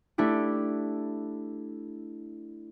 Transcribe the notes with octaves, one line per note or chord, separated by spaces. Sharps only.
A3 D4 E4 G4